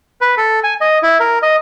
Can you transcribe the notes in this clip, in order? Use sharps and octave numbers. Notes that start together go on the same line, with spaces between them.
B4
A4
G#5
D#5
E4
A#4
D#5